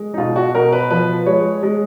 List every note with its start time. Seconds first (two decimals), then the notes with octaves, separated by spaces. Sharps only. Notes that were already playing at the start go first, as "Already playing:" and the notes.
Already playing: G#3
0.14 D#4
0.18 B2 F4
0.36 F#4
0.54 B2 A#4
0.72 B4
0.90 F3 B4
1.26 G#3 C#5
1.63 G#3